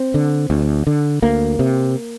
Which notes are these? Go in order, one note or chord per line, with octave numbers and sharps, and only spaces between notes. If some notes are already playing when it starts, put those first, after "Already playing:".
Already playing: C4
D3
D2
D3
D2 A#3
C3